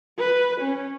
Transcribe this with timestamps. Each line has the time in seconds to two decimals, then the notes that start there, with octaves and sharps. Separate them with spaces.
0.19 B4
0.61 C#4